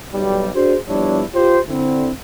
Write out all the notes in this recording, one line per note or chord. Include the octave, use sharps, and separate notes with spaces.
B1 G3
D4 F#4 G#4 C5
F3 G3 B3 D4 E4 C#5
F4 G4 C5
D3 C4 E4